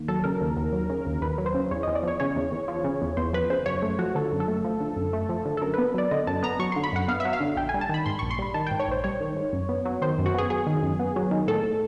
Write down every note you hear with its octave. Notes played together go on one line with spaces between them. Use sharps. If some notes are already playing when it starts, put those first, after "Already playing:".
Already playing: D#2
F#3 A4
C#3 A#4
D#2
D#2
F#3
C#3
D#2
D#2 B4
F#3
C5
C#3
E2 C#5
E2 D#5
D5
F3 C#5
C#3 C#5
E2
E2
F3
C#3
E2
E2 C5
F3 B4
C#3 C5
F#2 C#5
A3
F3 F#4
D3 A4
F#2
A4
A3
F3
D3
F#2
A3
F3
D3
A4
F#2 A#4
B3 B4
F#3 D5
D3 D#5
F#2 A5
B3 A#5
F#3 C#6
D3 C6
B5
F#2 F#5
B3 F5
E5
F#3
F5
D3
A#1 G5
G#5
G3
A5
D#3 B5
G#2 C6
A#1 C#6
C6
G3 B5
D#3 A5
G#2 G5
C#5
A#1 C5
G3 C#5
D#3
G#2
F#2
B3
F#3
D#3 C5
F#2
F#4
B3 G#4
F#3 G#4
D#3
F#2
B3
F#3
D#3
A2 A4
A2